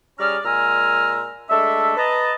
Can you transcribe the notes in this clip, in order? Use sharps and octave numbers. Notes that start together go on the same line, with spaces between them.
G3 C#4 G#4 D5 A#5 F6
A#2 G#3 G#5 A#5 E6 F6
G#3 A3 D4 A4 E5
B4 D#5 A5 A#5